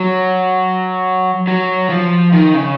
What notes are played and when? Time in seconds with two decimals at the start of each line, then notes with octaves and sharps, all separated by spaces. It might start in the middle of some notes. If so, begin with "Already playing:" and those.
Already playing: F#3
1.47 F#3
1.90 F3
2.33 D#3
2.54 C#3